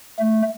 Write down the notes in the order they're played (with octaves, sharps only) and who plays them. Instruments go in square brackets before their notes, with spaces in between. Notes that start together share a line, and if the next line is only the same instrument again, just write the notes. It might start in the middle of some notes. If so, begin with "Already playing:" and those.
[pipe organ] A3